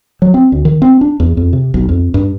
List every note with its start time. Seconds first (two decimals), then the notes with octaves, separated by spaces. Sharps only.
0.22 F#3
0.34 C4
0.52 D2
0.65 D#3
0.82 C4
1.01 D4
1.20 E2
1.37 F2
1.53 C3
1.74 B1
1.89 F2
2.14 G2